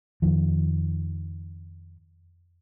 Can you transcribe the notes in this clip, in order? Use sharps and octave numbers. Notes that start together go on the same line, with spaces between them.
F2 D#3 F3